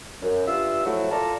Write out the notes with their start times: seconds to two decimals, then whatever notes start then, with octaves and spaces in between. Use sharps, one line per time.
0.22 F#2
0.47 G2 F4 E5 E6
0.86 F3 F#3 A3 E4 F#4
1.11 F4 A4 D5 A#5